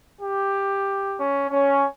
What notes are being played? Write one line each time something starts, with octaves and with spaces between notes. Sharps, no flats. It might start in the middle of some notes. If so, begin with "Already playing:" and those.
G4
C#4
C#4